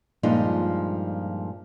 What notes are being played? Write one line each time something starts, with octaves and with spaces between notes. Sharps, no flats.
G2 A#2 F3 G#3 D#4 F4